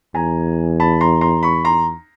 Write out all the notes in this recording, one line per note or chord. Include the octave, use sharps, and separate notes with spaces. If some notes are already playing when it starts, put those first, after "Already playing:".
E2 G#5 A#5
A5 B5
A#5 C6
A#5 C6
B5 C#6
A#5 C6